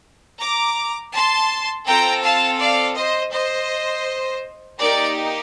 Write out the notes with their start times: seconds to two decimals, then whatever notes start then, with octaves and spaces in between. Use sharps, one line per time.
0.40 A#5 D6
1.13 A5 C6
1.86 C4 F4 A4 G5 A#5
2.23 F5 A5
2.59 D5 F5
2.96 C5 D#5
3.32 C5 D#5
4.79 A#3 D#4 G4 A#4 D5